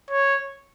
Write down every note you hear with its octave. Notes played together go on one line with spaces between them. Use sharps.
C#5